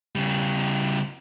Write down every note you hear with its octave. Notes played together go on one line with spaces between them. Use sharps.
C#3 G3